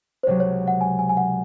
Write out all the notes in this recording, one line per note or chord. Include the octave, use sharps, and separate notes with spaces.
C5
C#2 C3 F#3 C#5
C#5
F#5
G#5
G#5
G#5
F#5